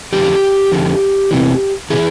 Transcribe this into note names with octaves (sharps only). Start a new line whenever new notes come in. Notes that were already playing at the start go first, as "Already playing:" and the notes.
F2 D3 F3 G4
F2 D3 F3
E2 C3 E3
C3 E3 G#4